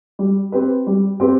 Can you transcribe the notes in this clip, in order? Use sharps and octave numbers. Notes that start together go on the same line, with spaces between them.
G3
C4 G4 B4
G3
C4 G4 B4